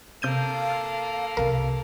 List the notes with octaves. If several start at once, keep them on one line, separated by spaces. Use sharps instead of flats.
C3 A#3 A4 F5 G6 D#7
C2 C3 A#4